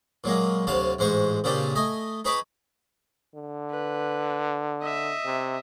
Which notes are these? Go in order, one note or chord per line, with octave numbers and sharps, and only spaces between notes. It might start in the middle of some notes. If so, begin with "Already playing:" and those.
A#2 F#3 G#3 A#3
D2 C3 F#3 F5 A5 C6
A1 G#2 G#3 C5 C#6
A#2 C#3 C4 D4 G4 A4
A3 D#5 G#5
D#4 G#4 B4 C#5 B5 D6
D3
B4
D#5 E5
C3